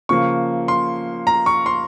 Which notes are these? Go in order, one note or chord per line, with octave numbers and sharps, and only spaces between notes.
C#3 F3 A#3 C#6
C6
A#5
C#6
C6